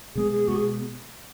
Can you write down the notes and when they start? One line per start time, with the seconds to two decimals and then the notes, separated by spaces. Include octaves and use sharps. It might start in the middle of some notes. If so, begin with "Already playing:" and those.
0.15 B2 G#3 B3 G#4
0.32 G#4
0.48 B2 G#3 B3 F#4
0.56 G#4